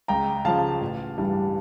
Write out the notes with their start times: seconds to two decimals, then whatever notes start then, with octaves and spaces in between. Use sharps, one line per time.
0.08 C#2 G5 A#5
0.45 C#3 F3 F5 A5
0.81 A1
1.18 G2 E3 G3